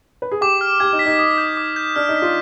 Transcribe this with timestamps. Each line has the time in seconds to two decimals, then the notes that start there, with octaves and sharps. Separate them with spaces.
0.22 B4
0.31 G#4
0.41 G4 D6
0.61 F6
0.80 G4 G#6
0.93 D#4
0.99 B6
1.06 D#4
1.19 D#6
1.38 G6
1.57 D6
1.76 G6
1.96 D4 F6
2.09 D#4
2.16 B6
2.22 F4